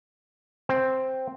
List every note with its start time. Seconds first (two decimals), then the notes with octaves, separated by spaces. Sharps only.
0.69 C4